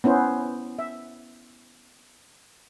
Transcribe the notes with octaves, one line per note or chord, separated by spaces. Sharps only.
B3 C#4 E4 C5
E5